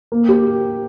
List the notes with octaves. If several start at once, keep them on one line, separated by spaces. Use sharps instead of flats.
A#3
G4